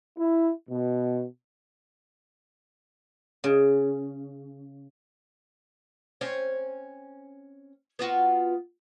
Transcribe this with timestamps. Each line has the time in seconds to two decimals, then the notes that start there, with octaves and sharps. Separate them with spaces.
0.19 E4
0.69 B2
3.44 C#3
6.21 C4 C#4
7.99 B3 F4 F#4